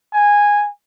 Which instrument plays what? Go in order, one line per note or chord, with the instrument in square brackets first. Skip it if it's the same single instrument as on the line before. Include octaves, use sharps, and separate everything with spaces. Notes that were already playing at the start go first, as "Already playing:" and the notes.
[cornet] G#5